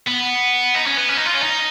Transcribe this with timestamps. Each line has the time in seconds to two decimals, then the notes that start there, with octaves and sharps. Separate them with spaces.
0.07 B3
0.74 D#4
0.86 C#4
0.97 B3
1.09 C#4
1.17 D#4
1.25 F4
1.34 C#4
1.42 D#4